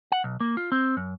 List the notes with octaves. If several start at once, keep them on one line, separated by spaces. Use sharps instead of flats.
F#5
B1
A#3
F4
C4
F#2